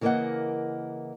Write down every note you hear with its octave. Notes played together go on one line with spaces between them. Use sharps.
C#3 E3 A#3 A#4 D#5 F#5